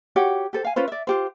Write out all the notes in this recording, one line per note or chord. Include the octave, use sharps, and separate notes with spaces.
F#4 G4 C#5 F#5
G4 A4 C5
F5 G#5
C#4 F4 B4 C5
D5 E5
F4 G4 C5